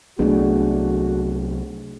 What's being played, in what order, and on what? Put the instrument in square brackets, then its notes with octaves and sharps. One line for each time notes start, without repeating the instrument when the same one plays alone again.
[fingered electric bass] C2 F#3 B3 [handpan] A3 D4 G#4 [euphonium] F#4